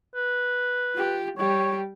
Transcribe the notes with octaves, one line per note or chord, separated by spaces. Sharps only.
B4
F4 G4
G3 G4 C#5